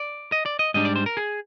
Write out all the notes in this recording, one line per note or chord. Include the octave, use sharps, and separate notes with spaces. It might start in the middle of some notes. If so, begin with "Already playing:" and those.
Already playing: D5
D#5
D5
D#5
G#2 G3 D4 D#5
D5
C5
A#4
G#4